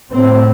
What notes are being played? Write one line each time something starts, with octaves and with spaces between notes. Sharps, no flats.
A2 C4